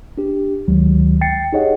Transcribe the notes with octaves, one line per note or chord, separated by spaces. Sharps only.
D4 G4
D2 D#3 F#3 G#3
G5 A6 C7 C#7
D#4 G4 G#4 C#5 D#5 F#5